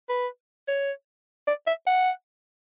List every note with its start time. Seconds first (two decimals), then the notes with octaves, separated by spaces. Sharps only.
0.09 B4
0.68 C#5
1.47 D5
1.67 E5
1.87 F#5